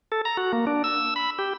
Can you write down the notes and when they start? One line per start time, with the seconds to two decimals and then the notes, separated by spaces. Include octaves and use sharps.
0.12 A4
0.25 A#5
0.37 F#4
0.53 A#3
0.67 D4
0.84 E6
1.16 B5
1.39 G4